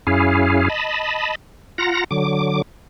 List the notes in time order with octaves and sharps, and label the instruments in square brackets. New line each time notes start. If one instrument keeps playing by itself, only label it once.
[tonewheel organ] F#2 C#4 E4 G#4 F5
D#5 A5 B5
F4 F#5 A#5 A#6
D3 F#3 D6